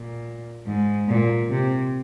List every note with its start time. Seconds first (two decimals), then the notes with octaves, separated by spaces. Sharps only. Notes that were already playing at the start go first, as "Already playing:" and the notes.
Already playing: A#2
0.66 G#2
1.09 A#2
1.50 C3